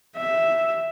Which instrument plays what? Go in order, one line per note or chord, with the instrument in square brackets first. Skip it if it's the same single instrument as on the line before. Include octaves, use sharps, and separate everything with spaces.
[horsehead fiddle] E5